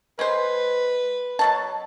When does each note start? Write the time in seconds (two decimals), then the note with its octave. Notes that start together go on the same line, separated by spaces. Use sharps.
0.19 G#3 B4 C5
1.39 B2 F#3 A5